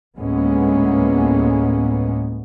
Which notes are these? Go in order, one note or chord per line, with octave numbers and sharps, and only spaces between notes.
D2 A2 G#3 A#3 B3 C#4